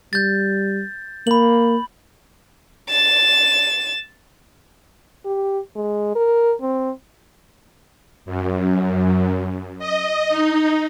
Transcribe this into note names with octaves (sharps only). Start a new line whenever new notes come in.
G3 G6 A6
A#3 B5 F#7
A6 E7
G4
G#3
A#4
C4
F#2
D#5
D#4